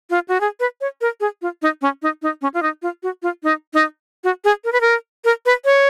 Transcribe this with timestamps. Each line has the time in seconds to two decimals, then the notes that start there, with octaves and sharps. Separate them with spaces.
0.10 F4
0.28 F#4
0.41 G#4
0.60 B4
0.81 C#5
1.01 A#4
1.20 G#4
1.42 F4
1.62 D#4
1.82 C#4
2.02 D#4
2.22 D#4
2.42 C#4
2.54 F4
2.63 D#4
2.82 F4
3.03 F#4
3.22 F4
3.43 D#4
3.74 D#4
4.24 F#4
4.44 G#4
4.64 A#4
4.72 B4
4.81 A#4
5.25 A#4
5.46 B4
5.65 C#5